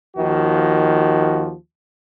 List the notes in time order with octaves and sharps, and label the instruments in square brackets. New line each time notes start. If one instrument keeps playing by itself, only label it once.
[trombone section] D#2 D#3 F3 F#4